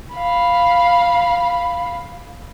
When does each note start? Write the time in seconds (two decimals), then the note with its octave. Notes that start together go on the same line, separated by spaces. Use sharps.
0.13 F5 B5